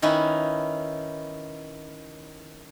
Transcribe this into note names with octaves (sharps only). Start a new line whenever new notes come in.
D#3 C#4 D#4 E4 B4